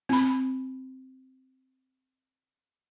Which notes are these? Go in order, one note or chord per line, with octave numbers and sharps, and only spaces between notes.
C4 B5